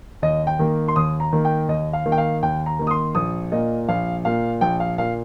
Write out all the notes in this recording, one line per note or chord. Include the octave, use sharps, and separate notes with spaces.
D#2 D#5
G5
D#3 A#3
C6
D#2 D#6
A#5
D#3 A#3
G5
D#2 D#5
F5
D#3 A#3
G5
F5
D#2 G5
A#5
D#3 A#3
D#6
C6
A#1 D#6
A#2 A#3 D#5
A#1 F5
A#2 A#3 F5
A#1 G5
F5
A#2 A#3 F5